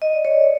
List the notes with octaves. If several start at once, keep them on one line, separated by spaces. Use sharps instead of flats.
D#5
D5
C#5